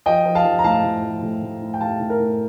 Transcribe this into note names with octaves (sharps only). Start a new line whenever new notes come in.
F3 D#5 G5
F3
F5 A5
F3
A#5
A2 F5 A5
A2
F3
A2
A2
A2
G5
A2 F5 A5
A2
A#4
A2